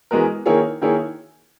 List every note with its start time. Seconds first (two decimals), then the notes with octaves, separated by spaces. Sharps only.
0.11 E3 G#3 B3 F#4 A#4
0.46 D#3 A#3 E4 G#4 C#5
0.81 D#3 A#3 E4 G#4 C#5